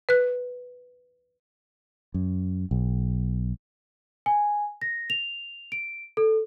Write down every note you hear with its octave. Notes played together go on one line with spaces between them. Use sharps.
B4 F#6
F#2
B1
G#5
A#6
F7
D7
A4